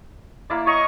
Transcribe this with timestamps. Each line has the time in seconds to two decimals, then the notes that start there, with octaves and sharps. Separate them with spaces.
0.50 A#3 E4 D5
0.67 C#5 D#5 A#5 C#6